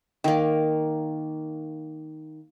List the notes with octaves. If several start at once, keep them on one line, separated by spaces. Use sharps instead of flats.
D#3 A#3